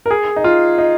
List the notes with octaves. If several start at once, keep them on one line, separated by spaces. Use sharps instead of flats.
A#4
G#4
D#4
F4
D#4